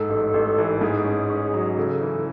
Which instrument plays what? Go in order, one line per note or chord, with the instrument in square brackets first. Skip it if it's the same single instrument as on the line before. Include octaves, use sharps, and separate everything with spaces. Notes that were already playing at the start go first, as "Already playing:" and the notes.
Already playing: [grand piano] G#2 [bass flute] A4
[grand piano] A1
A1
E3
[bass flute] A4
[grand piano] G#2 [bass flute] G#4
[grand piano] C#4
C#4
F#3
[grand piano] C#3 [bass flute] A4
[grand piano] E3